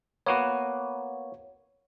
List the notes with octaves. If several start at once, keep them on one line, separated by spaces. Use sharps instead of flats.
A#3 B3 F#4 C#5